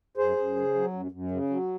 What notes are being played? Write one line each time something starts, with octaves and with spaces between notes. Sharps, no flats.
F#2 G#4 C5
F#2
C#3
F#3
F#2
F#2
C#3
F#3